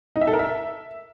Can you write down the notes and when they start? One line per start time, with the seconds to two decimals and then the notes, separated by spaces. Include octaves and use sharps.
0.16 D#4
0.21 E5
0.27 A4
0.33 A#4
0.39 E5